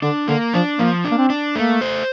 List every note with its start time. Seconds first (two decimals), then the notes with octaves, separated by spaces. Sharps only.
0.02 D3 D4
0.28 D3 A#3
0.54 F3 D4
0.79 F3 A#3
1.04 D4
1.11 A#3
1.18 C4
1.30 D4
1.55 A3 A#3
1.81 C5